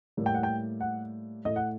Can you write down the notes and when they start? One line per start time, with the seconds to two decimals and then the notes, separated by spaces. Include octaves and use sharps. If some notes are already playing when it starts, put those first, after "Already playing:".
0.17 A2 G3 A#3
0.26 G5
0.34 F#5
0.43 G5
0.81 F#5
1.45 A2 A3 D#5
1.56 F#5